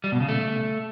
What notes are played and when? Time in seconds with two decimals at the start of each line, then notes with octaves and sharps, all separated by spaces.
0.04 G3
0.12 B2
0.20 C#3
0.29 A3